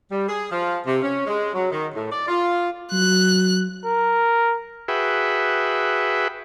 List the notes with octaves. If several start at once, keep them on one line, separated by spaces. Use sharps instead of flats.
G3
G#4
F3
C3
C#4
G#3
F#3
D#3
A2
D5
F4
F#3 F#6
A#4
F#4 G#4 B4 E5 G5